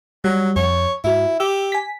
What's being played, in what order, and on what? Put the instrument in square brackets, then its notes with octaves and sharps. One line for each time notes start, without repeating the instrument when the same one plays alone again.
[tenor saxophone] F#3 [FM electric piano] G3
[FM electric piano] F2 [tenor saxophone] C#5
[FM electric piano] G#2 F#4 [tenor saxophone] E4
[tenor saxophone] G4 [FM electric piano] E6
[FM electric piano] G#5 B6